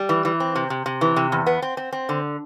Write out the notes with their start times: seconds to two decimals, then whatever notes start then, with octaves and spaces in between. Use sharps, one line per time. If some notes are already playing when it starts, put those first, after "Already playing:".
Already playing: G3
0.09 E3
0.25 E3
0.40 C4
0.56 C3
0.70 C3
0.86 C3
1.01 E3
1.16 C3
1.32 E2
1.46 B3
1.62 C4
1.77 C4
1.92 C4
2.09 D3